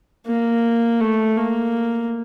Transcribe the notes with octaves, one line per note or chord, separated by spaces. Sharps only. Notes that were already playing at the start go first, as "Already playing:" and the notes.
A#3
A3
A#3